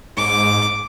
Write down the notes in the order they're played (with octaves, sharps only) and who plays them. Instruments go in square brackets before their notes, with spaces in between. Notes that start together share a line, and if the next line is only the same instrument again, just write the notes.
[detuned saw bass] G#2 [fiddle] D6